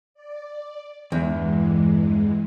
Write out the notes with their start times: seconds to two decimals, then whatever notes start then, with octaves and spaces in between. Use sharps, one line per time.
0.14 D5
1.12 E2 G2 E3 G#3